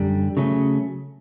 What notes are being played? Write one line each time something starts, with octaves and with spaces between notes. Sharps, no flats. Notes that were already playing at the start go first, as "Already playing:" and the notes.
Already playing: F#2 D3 G3
C#3 F#3 A3 C#4